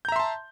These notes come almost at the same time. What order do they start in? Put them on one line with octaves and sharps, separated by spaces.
G6 A#5 E5 C6 A5